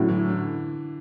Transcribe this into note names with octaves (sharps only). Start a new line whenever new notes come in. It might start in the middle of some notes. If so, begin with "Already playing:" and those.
Already playing: A2 D3 F#3 C#4
E3
D3